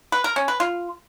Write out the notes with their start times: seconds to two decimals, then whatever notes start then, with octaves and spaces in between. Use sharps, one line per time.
0.12 B4
0.24 A#4
0.36 C#4
0.48 B4
0.60 F4